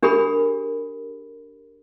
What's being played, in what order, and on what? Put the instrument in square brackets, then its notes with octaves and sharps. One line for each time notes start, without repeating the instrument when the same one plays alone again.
[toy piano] D4 G4 G#4 A#4 B5